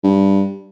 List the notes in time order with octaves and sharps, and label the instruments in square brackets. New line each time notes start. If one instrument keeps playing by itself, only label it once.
[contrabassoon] G2